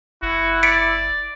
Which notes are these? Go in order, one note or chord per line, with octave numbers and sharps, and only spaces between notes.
F#1 E4 F#4
D5 B6 C#7 D7